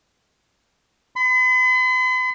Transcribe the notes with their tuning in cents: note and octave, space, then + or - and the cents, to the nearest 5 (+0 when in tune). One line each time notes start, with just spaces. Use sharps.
B5 +45